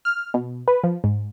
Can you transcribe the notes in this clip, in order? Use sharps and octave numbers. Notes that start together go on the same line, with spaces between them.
F6
B2
B4
F3
G#2